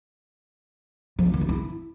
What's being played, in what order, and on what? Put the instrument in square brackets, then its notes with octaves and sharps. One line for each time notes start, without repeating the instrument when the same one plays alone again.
[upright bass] F3
C4
D#3
D4
E4